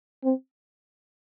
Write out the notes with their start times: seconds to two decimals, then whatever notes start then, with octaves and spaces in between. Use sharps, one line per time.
0.24 C4